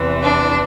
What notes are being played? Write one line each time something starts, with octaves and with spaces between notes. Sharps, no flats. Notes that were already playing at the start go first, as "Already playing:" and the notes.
Already playing: E2 C3 E3
D4